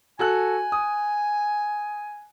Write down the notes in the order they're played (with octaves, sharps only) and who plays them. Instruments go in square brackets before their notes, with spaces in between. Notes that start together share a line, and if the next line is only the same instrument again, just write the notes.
[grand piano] F#4 A4 F#6 [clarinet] G#5
[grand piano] D#6